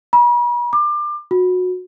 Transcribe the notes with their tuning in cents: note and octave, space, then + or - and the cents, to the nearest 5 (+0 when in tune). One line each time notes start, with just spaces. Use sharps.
B5 -45
D6 +25
F#4 -20